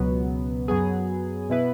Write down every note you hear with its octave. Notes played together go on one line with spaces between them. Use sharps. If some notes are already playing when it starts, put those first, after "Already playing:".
Already playing: C#2 B2 F#3 B3
F#2 F#3 B3 G#4
B2 B3 E4 B4